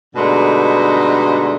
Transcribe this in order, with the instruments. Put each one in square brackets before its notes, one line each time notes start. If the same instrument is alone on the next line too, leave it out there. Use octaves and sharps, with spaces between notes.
[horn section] G2 B2 D3 G#3 A3 D#4